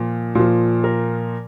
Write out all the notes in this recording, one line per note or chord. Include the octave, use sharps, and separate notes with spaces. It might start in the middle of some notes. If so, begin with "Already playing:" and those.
Already playing: A#2 F3
A#2 F3
A#4